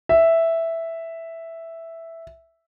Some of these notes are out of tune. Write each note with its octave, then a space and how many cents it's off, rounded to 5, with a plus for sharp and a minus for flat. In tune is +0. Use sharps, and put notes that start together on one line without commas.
E5 +0